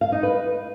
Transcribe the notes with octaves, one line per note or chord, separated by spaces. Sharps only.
F5
D#4
B4